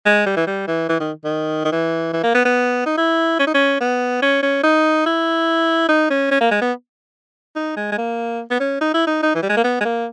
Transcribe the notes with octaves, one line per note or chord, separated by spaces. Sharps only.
G#3
G3
E3
G3
E3
E3
D#3
D#3
D#3
E3
E3
A#3
B3
B3
D#4
E4
C#4
D#4
C#4
B3
C#4
C#4
D#4
E4
D#4
C#4
C#4
A#3
G#3
B3
D#4
G#3
G#3
A#3
B3
C#4
D#4
E4
D#4
D#4
E3
G3
G#3
A#3
B3
G#3
A#3